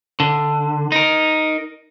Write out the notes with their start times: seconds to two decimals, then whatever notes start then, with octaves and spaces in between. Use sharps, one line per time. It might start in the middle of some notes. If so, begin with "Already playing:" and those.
0.20 D3
0.92 D#4 A#4